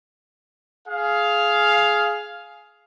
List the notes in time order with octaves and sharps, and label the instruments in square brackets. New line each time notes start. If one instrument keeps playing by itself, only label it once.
[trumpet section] G#4 F5